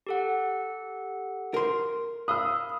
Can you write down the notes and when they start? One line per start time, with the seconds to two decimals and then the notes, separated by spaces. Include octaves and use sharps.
0.07 G4 A4 F#5
1.54 A#4 C6
2.28 F5 B5 D#6 E6